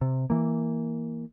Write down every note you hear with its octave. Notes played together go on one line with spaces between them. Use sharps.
C3
E3 A#3